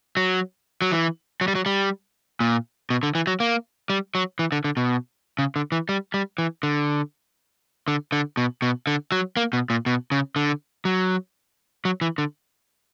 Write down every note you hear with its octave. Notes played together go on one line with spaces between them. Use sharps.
F#3
F#3
E3
F#3
G3
F#3
G3
A#2
B2
D3
E3
F#3
A#3
G3
F#3
E3
D3
D3
B2
C#3
D3
E3
G3
G3
E3
D3
D3
D3
B2
B2
D3
F#3
A#3
B2
A#2
B2
C#3
D3
F#3
F#3
E3
D3